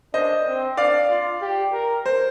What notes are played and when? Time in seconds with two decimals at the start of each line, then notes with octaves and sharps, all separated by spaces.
0.13 D4 C5 D#5
0.46 C4
0.77 D4 D5 F5
1.10 F4
1.41 G4
1.73 A#4
2.06 C5